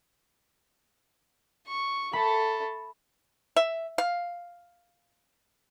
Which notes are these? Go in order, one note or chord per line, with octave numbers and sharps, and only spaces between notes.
C#6
A3 A4 B5
E5
F5